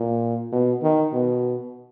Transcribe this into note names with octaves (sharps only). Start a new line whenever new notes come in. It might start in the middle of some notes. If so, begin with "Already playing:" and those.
Already playing: A#2
B2
D#3
B2